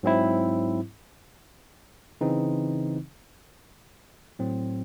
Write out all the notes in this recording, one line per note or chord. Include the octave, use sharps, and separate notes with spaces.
G#2 F#3 C4 E4
C#3 E3 C4 D#4
A2 F#3 C4